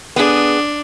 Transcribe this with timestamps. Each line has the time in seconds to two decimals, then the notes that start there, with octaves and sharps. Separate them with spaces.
0.16 B3 D4 G#4